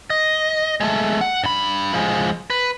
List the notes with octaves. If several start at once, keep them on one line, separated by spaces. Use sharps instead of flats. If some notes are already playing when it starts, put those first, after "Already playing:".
D#5
G#3 A3
F#5
G2 B5
F3 G#3
B4